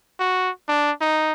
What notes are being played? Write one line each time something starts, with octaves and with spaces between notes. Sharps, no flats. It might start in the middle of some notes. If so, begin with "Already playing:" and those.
F#4
D4
D#4